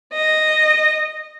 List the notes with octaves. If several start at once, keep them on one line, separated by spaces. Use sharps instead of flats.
D#5